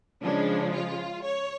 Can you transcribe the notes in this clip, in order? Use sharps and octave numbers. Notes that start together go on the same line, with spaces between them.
C#3 F3 G#3 D4
F4
C#5